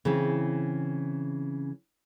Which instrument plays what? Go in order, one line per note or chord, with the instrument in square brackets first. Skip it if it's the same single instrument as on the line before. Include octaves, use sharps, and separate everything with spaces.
[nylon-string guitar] C#3 E3 C4